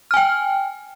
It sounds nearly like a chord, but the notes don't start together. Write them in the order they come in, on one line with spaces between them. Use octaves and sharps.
F6 G#5 G5